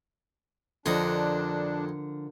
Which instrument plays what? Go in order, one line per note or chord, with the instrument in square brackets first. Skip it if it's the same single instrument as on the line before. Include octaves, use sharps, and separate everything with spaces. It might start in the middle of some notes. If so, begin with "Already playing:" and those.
[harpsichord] F2 D#5 [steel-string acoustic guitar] D3 F3 A#4 [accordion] D4